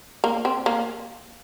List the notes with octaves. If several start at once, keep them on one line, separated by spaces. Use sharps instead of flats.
A#3
C4
A#3